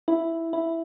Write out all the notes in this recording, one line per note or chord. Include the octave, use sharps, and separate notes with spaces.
E4
E4